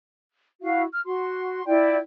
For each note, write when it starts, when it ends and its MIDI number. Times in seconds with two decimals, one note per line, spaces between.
0.62 0.83 64
0.62 0.83 66
0.62 0.83 77
0.92 1.01 89
1.06 1.64 66
1.06 1.64 84
1.66 1.96 64
1.66 1.96 65
1.66 1.96 74
1.66 1.96 79